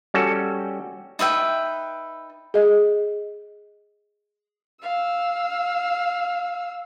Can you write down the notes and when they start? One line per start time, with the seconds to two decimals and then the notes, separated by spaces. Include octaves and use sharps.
0.14 G3 C#4 F#4 A4
1.19 D#4 B4 E5 G5
2.54 G#4 D#5
4.83 F5 E6